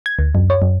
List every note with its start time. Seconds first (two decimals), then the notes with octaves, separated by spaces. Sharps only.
0.06 G#6
0.19 D2
0.35 F#2
0.50 C#5
0.62 F#2